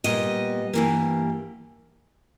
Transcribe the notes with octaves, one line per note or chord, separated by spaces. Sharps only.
A#2 G3 B3 D#5
G2 E3 G3 A#3